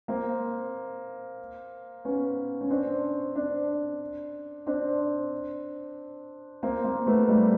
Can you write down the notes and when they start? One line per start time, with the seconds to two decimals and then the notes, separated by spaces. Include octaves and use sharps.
0.08 A#3 C4
2.05 B3 C#4
2.61 C#4
2.70 C4 D4
3.36 C4 D4
4.66 C4 D4
6.63 A#3 C4
6.84 A#3 C4
7.07 A3 B3
7.28 G3 A3